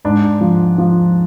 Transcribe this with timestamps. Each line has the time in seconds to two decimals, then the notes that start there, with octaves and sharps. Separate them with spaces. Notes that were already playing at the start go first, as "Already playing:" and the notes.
0.05 G#2 D4
0.41 F3
0.78 F3